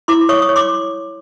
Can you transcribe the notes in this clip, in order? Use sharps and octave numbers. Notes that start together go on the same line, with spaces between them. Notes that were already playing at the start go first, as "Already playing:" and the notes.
E4 C6 D6
C#5 C#6 D#6
C#6 D#6
C#5
C6 D6